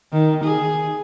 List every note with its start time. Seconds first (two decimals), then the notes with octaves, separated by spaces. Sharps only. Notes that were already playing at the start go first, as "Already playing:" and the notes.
0.13 D#3
0.44 G#4